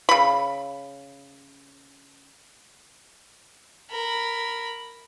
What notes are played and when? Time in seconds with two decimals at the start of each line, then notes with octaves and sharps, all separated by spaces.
0.09 C#3 B5
3.90 A#4 B5